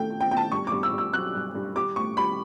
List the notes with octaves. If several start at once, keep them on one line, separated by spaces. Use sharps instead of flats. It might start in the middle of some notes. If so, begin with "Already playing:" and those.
Already playing: A3 G5
A3
G5
B2 G5
A5
G2 C#6
G2 D6
E6
G2
E6
F#3 F#6
G2
G2
G3 D6
A2 C#6
G3 B5